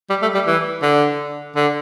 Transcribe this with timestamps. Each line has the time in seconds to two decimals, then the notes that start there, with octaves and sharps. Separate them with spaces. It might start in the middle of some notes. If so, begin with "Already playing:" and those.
0.10 G3
0.22 A3
0.34 G3
0.47 E3
0.82 D3
1.56 D3